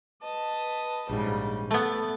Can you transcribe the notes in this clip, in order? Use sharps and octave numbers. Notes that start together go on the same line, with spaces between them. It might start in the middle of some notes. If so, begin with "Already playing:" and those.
B4 D#5 A5
A#1 G#2 C#3 G3
A3 B3 A6